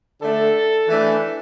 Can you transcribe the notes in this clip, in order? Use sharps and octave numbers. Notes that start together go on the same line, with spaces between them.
D3 A3 D4 A4
E3 A3 D4